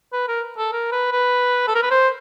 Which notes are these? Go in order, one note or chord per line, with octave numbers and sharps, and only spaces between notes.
B4
A#4
A4
A#4
B4
B4
A4
A#4
B4
C5